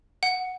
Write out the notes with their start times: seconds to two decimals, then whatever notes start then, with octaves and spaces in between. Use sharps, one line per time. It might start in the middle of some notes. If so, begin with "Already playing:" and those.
0.23 F#5